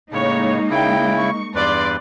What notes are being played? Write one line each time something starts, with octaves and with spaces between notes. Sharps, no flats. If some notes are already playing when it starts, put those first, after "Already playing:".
A2 C#3 G#3 A#3 D#4 C#5
C#3 E4 G5
C#6
E2 G2 B4 D5 C6